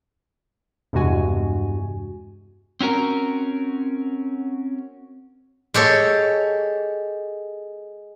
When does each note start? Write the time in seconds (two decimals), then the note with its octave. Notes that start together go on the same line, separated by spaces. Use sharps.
0.93 E2 G2 C3 G#3 F#4 G#5
2.81 C4 C#4 F#4 A#4
5.74 G#3 G4 A4 C#5